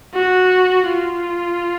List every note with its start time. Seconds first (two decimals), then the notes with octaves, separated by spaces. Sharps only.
0.14 F#4
0.87 F4